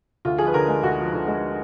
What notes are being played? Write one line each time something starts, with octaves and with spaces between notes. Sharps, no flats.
D2 F4
F3 G#4
B4
D3 A#4
G#3 G#4
D2 F#4
F3
D3
G#3